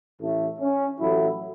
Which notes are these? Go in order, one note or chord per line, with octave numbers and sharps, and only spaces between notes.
A1 A2 A3
C#4
A1 A2 F#3 E4